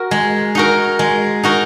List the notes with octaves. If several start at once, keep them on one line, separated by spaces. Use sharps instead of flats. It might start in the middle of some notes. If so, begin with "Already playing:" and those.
Already playing: F#4 A#4
G#3
D#4 F#4 A#4
G#3
D#4 F#4 A#4